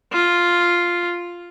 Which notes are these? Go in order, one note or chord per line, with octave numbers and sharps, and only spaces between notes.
F4